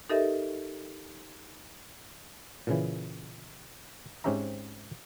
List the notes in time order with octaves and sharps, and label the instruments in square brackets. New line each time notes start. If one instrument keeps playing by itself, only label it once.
[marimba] D#4 G4 A4 A#4 D#5 E5
[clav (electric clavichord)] A#2 C#3 E3
G#2 C4 C#4 G4 E5 A#5